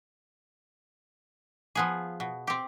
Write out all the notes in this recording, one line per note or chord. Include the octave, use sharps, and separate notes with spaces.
F3 B3 G#4
B2
C4 G4